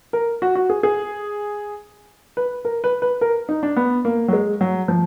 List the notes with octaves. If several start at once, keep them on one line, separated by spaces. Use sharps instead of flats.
A#4
F#4
F#4
G#4
G#4
B4
A#4
B4
B4
A#4
D#4
D4
B3
A#3
F#3
G#3
F#3
F3